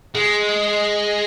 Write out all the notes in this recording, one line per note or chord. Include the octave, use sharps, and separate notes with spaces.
G#3